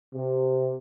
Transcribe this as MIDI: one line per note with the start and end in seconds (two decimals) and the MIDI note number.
0.14 0.76 48